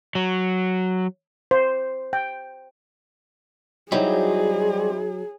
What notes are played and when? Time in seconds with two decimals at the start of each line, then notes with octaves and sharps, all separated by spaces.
0.15 F#3
1.51 C5
2.13 G5
3.92 F#3 G3 C4 D#4 E4 F#4 G#4